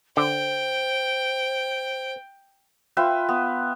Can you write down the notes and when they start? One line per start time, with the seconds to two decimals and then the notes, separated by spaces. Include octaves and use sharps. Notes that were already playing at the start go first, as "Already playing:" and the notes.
0.17 D3 C5 G5
2.97 F4 B4 E5 G5
3.29 B3